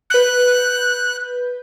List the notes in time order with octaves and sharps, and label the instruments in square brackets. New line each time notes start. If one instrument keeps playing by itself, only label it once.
[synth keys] B4 G6 [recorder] F#6